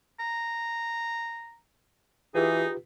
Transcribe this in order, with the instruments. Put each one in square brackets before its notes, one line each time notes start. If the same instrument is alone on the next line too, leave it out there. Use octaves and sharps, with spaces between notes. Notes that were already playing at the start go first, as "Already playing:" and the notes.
[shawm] A#5
[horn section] E3 G#4 [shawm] D#4 [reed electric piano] F4 G4 B4